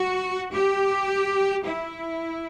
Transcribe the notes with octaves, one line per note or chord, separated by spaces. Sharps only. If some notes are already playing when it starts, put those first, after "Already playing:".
Already playing: F#4
G4
E4